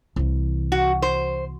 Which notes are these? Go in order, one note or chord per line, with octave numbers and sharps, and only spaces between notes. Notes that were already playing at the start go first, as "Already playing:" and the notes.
C2 E3
F#4
C5